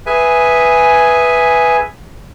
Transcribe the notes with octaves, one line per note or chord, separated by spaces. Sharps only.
G#4 B4 E5 G#5